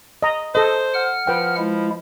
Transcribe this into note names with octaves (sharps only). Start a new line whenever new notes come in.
D#5 A#5
A4 C5 D#5
F#5 F6
F3 B4 G5
G#3 E4